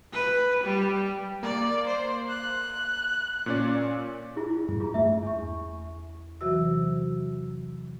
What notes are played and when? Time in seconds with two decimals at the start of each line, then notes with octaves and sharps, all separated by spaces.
0.13 B4
0.64 G3
1.43 A#3 D5
1.87 C5
2.29 F#6
3.46 A#2 C#4 D5
4.36 E4 F4 G#4
4.68 G2
4.80 F4 G#4 A#5
4.94 G2 A3 E5
5.23 E2 C#6
6.41 C3 E3 F#3 F#4 E6